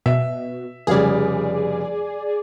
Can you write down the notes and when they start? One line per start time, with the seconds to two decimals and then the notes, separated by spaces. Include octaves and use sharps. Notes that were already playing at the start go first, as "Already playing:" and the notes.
0.06 B2 E5
0.87 F1 C#3 G3 G#4 D5